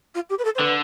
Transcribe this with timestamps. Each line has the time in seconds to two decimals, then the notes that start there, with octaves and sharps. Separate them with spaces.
0.14 F4
0.29 G4
0.38 B4
0.44 A4
0.55 C5
0.59 D3 B4